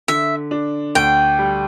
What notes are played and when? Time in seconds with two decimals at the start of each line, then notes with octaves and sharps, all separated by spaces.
0.08 D3 E5
0.51 D4
0.95 D2 G5
1.39 G3